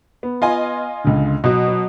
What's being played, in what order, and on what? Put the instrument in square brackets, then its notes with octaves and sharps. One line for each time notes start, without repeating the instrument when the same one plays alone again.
[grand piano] B3
[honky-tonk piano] F4 D#5 G#5
[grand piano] C#2 D3
[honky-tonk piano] B2 [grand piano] F#3 F#4
[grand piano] F#3